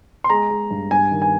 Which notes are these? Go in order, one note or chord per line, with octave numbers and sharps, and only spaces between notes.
C6
G#3 A#5
G#3
G2
G2 G#5
D#3
G#5